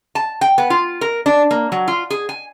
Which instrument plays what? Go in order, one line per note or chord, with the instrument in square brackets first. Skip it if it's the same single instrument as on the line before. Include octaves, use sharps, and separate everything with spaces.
[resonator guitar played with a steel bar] A5
G5
B3
F4
A#4
D4
A#3
F#3
F4
G#4
G#5